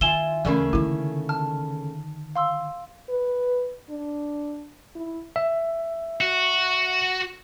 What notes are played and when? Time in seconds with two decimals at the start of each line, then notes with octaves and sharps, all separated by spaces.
0.01 D#3 E4 F4 G#5 E7 G7
0.45 D#2 C#3 E3 A3 A#3 C#4
0.73 D3 D#3 E4
1.29 A5 F6
2.36 F5 C6 E6
3.09 B4
3.90 D4
4.95 E4
5.36 E5
6.21 F#4